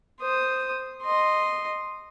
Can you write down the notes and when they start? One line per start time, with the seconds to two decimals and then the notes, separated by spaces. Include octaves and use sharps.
0.20 C5 D#6
1.03 D#5 C6